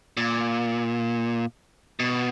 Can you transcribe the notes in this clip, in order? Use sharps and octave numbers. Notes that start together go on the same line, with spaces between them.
A#2
B2